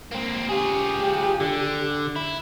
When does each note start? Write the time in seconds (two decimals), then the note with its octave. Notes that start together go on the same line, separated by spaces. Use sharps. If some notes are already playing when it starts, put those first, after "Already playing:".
0.11 A#3 C4
0.49 F4 G4 G#4
1.40 D3
2.16 E4